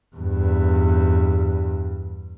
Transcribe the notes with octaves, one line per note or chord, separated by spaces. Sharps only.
E2 G2